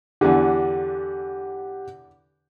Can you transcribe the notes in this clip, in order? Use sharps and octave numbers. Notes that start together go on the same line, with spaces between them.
E2 D3 G4 F#5